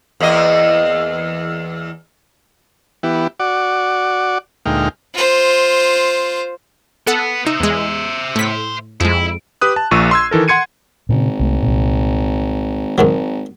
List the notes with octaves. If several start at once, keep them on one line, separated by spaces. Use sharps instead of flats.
E2 A#3 D#5
E3 B3 E4 G4
F#4 D5 F#5 D6
D2 A#2 G#3 D#4 G5 F6
F4 C5
B3 A4 F#5
D#4 C5 E5
E2 G#3
A2 B6
F2 G#3 E4
G4 B4 D#6 F#6
A5
A#1 A#2 C#6 E6 D#7
C6 E6 G#6
D#3 E3 A4 A#4
F#5 C6 G#6 C#7 D#7
G#1 A#2 C#3
C2 A3
C2 A#2
G#1 G#2 D#3 F#3